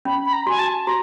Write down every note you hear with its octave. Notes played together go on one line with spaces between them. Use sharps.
C#4 B5
B5
A#5
F#4 G#5
A5
F#4 A#5